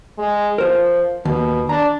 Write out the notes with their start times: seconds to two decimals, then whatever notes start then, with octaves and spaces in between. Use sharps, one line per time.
0.18 G#3
0.58 F3 A#4 C5
1.25 D#2 B2
1.69 D4 A#5